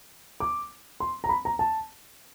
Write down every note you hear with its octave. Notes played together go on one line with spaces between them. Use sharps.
D6
C6
A#5
B5
A#5
A5